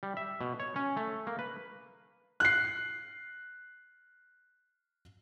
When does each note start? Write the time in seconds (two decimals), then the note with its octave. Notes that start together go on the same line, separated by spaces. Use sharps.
0.03 G3
0.17 E5
0.41 B2
0.60 C#5
0.76 C#4
0.97 A3
1.27 A#3
1.39 B4
2.40 F#6 C7